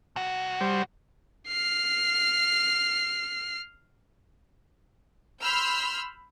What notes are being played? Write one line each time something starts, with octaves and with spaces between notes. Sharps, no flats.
C2 F#4
G3 C5
F6 C7
B5 C6 E6 F6 G6